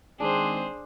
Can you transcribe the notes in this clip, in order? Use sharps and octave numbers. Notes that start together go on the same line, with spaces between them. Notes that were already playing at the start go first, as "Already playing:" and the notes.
D#3 G#3 C4 D4 G#4 C5